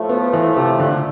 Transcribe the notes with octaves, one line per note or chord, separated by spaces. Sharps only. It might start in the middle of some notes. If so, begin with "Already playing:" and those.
Already playing: A2 F3 A3
B3
E3
C3
D3